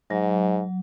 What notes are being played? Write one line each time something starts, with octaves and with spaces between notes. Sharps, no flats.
G#2 F#3